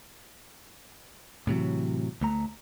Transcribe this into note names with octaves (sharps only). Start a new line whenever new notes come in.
A2 C3 E3 F#3
D2 A3 A#5